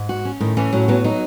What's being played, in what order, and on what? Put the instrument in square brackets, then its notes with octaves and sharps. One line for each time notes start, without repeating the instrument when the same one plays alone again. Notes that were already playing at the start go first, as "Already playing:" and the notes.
Already playing: [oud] G#2
[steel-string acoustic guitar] F#4
C#4
[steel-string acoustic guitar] A2 [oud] D#3
[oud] E3 [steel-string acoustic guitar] C#4
[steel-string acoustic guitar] A2 [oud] F#3
[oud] F#3 [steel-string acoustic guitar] B3
[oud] F#3 [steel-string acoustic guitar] D#4